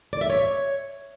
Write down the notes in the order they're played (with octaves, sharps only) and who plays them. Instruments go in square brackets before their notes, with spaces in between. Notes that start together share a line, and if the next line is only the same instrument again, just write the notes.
[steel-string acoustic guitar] D5
E5
C#5